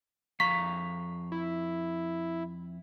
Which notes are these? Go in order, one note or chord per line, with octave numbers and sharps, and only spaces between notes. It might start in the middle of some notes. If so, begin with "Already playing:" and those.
F2 F5 A#5 C#6 B6
E4